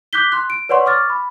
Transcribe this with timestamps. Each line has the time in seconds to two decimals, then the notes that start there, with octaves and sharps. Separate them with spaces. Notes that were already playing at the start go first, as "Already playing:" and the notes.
0.13 D6 F#6 G6 B6 G7
0.32 C6 F#6
0.50 D7
0.69 B4 C#5 D5 F#5 C6 C#6
0.86 C#6 D6 F6 A6
1.10 B5